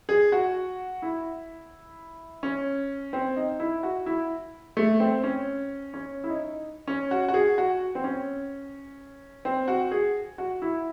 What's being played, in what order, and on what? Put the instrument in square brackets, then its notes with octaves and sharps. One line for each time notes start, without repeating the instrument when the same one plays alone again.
[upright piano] G#4
F#4
E4
C#4
C4
D#4
E4
F#4
E4
A3
C4
C#4
C#4
E4
D#4
C#4
F#4
F#4
G#4
F#4
C4
C#4
C4
F#4
G#4
F#4
E4